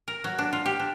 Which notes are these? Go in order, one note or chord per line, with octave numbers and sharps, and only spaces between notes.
A#4
F#3
D4
F4
G4
D4